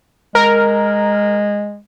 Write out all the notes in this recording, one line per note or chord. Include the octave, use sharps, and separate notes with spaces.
G#3 A#4